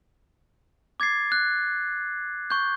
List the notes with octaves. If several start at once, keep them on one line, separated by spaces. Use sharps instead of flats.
D6 G#6 A6 C7
F#6
C#6 G6